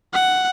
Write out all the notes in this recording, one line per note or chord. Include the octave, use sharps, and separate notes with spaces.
F#5